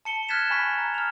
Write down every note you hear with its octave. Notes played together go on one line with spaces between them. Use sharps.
A5 C#7 G7
F6 F#6 G#6 A6 B6 E7
G#5 B5 C#6 B6
A#5
F6 F7